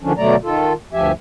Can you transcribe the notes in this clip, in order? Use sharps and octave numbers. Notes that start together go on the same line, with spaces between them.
D3 D#3 F3 C#4 D4
B2 D3 F#3 A3 D5 A#5
D#3 F4 A4
D2 G2 F3 G4 E5 G#5